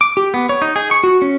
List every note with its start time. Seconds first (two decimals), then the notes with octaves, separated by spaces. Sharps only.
0.01 D6
0.17 G4
0.34 B3
0.49 C#5
0.62 D#4
0.76 G#4
0.91 C#6
1.04 F#4
1.22 C#4